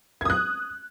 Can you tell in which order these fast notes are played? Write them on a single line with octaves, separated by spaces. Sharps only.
G#6 D#6 F#6